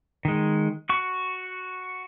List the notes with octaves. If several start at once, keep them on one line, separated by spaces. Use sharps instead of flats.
D#3 G#3
F#4 C#6